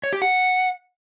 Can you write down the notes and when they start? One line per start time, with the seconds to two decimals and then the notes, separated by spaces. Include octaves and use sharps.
0.04 C#5
0.13 G4
0.22 F#5